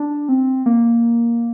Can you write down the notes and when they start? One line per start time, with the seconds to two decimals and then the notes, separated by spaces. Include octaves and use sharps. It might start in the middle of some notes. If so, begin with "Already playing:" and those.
Already playing: D4
0.29 C4
0.66 A#3